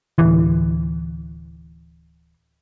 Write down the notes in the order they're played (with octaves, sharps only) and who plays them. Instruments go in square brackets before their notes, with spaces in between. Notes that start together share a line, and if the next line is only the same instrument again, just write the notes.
[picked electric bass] D1 C2 E3